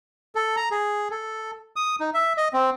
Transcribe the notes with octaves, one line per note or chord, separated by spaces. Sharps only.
A4
A#5
G#4
A4
D#6
D#4
E5
D#5
C4